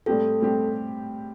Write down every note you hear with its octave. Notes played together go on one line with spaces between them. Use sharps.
A2 G3 C4 G4 A4
A2 G3 C4 G4